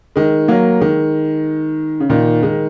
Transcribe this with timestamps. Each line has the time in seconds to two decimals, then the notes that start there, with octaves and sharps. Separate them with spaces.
0.16 D#3 G#3
0.48 F#3 A#3
0.80 D#3 G#3
2.00 C#3
2.10 A#2 D#3
2.43 D#3 G#3